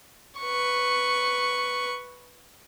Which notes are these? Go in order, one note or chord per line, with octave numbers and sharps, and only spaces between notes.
B4 C#6